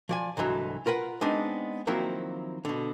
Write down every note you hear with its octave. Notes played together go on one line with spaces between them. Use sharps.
F3 D5 G#5
C2 G#2 D3 E3 F#3
F4 A#4 B4 F#5
G#3 B3 C4 D4 D#4
D#3 F3 F#3 A#3 C4 E4
B2 D3